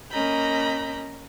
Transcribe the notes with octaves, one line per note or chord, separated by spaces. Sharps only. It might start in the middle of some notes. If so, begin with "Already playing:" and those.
A#3 C#4 D#5 A#5 B5 G6